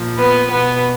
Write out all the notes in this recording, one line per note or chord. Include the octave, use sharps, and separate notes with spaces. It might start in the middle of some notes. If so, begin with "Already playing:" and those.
Already playing: A#2 F3
B3 B4
B2 B3 B4